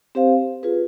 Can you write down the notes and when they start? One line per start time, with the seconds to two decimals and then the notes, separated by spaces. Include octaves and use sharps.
0.15 C4 G4 C5 F5
0.63 F4 G#4 B4